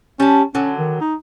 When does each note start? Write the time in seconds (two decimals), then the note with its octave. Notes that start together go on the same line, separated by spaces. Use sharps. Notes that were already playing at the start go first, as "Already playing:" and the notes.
0.20 G3 C#4 A5
0.55 D3 F#3 C#4
0.79 D#3
1.01 D#4